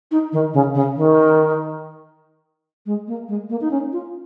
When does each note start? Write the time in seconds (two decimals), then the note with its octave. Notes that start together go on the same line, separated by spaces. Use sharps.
0.11 D#4
0.32 D#3
0.54 C#3
0.75 C#3
0.96 D#3
2.86 G#3
3.08 A#3
3.28 G#3
3.50 A#3
3.61 D#4
3.71 C#4
3.93 F4